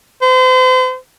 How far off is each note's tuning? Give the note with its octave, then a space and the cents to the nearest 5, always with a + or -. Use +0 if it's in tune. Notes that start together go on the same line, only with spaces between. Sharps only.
C5 -40